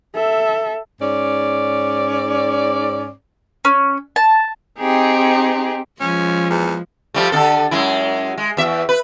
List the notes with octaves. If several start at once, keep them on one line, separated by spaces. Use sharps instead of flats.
A4 E5
G#2 C#4 D5
C#4
A5
C4 D#4 G4 G#4
F3 G#3 C#4
E2
F3 G3 A3
D3 A4
F#2 G#3 E4
G#3
E2 E5
B4